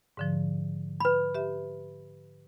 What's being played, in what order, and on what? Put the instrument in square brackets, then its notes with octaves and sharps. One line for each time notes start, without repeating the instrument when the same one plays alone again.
[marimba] G#2 D3 F3
[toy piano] B4 B5
[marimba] G4 E5